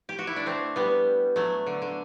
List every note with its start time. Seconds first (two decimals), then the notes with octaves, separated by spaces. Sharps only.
0.09 G4
0.19 F#4
0.27 E4
0.36 D4
0.46 A3 C4
0.76 G3 B3
1.36 F#3 A3
1.67 D3
1.82 D3